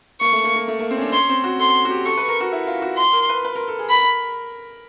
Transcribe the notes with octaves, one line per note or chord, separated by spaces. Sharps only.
A#3 C#6
A3
A#3
A#3
A3
A#3
C4
C#4
D4
C4
C#4 C6
C4
F#4
A4 C6
F#4
G4
A4 C#6
B4
A#4
F#4
E4
F4
F#4
C6
A#4
B4
B4
A#4
A4
G#4
A#4 B5